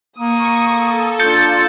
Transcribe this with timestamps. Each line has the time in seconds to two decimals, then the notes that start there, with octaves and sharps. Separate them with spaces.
0.18 A#3 C#6 D#6
0.66 A4
1.19 D4 F4 G6 A6 C#7